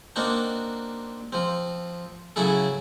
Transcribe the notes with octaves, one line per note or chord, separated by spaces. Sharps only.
A#3 C4 D4 D#4 F#4
F3 C4
C#3 F#3 E4 G#4 A4